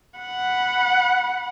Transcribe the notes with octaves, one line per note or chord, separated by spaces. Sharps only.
F#5 B5